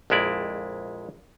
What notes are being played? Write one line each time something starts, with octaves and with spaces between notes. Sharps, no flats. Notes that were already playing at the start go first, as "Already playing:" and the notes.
A#1 F2 G#3 E4 D5